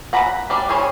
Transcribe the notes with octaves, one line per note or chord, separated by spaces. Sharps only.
F#5 A#5 B5
G3 D4
G3 G#4 C5 C#5